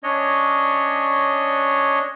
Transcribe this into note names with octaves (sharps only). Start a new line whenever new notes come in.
C#4 D4 C#5 D#5